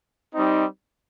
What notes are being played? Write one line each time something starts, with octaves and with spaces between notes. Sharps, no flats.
G3 C4 D#4